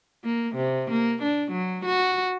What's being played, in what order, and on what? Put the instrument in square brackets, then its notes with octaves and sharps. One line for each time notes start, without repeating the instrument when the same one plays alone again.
[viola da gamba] A#3
C3
A#3
D4
F#3
F#4